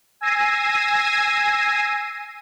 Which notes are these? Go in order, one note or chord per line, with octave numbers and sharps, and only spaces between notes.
G#5 E6 G#6 A#6 C7 D#7